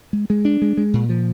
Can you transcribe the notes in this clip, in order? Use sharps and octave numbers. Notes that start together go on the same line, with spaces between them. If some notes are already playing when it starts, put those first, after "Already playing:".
G#3
G#3
D4
G#3
G#3
A#2
F3